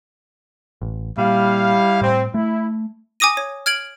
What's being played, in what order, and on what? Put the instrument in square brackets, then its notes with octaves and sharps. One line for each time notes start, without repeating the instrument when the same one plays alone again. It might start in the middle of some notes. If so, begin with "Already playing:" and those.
[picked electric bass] A1
[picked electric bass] A#2 [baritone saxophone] G3 [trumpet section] E4 F5
[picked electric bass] A2 [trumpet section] C4
[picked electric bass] A3 [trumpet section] E4
[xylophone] G#5 D6 D#6 A#6 D#7
C#5
F6 G#6 D7 F#7